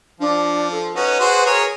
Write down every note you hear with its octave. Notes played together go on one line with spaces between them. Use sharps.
F3 D4
A4
C#4 D#4 F#4 B4
F#4 G#4 C5
G#4 A#4 C#5